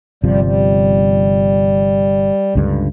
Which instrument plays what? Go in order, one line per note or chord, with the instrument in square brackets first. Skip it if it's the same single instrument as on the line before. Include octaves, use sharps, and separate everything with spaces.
[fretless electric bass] G1 C3 F3 [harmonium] G3
[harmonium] G3
[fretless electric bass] C#2 G2 D3